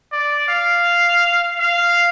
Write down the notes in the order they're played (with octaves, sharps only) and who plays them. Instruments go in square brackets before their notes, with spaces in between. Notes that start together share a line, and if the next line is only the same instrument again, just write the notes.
[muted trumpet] D5
F5
F5